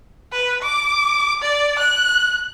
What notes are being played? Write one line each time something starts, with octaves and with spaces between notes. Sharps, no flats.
B4
D6
D5
F#6